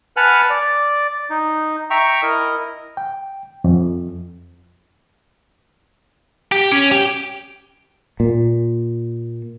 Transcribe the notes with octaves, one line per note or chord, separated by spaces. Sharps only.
B4 F#5 G#5 A5 F6 F#6
D5
D#4
E5 G5 A#5 C#6
E4 A#4 D#5
G5
F2
G4
C#4
G4
A#2